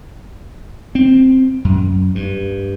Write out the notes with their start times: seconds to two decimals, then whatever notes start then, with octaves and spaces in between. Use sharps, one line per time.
0.95 C4
1.65 F#2
2.15 G2